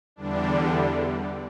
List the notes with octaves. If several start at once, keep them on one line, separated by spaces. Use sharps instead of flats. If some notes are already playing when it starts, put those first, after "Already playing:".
E2 D3 G3 D4